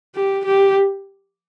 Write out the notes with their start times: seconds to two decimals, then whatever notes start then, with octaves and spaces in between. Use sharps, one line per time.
0.15 G4
0.45 G4